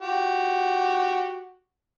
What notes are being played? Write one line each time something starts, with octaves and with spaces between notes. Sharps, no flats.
F#4 G4